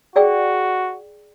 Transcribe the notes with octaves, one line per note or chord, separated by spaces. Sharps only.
F#4 G#4 D5 G5